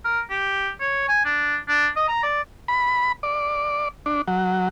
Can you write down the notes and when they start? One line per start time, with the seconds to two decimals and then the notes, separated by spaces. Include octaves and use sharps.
0.05 A#4
0.30 G4
0.80 C#5
1.08 G#5
1.25 D4
1.68 D4
1.96 D#5
2.08 A#5
2.23 D5
2.68 B5
3.23 D5
4.06 D4
4.28 F#3